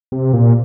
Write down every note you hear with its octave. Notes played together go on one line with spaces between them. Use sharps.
C3
A#2